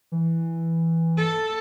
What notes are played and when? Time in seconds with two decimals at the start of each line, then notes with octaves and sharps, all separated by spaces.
0.12 E3
1.18 A4